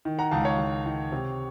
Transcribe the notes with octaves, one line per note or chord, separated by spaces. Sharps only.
D#3
F#5 A#5
C#2 F5 A5
C#5 F5
C#2
D#3
C3